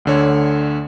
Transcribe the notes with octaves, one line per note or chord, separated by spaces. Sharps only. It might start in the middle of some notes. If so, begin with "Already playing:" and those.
D2 D3 C#5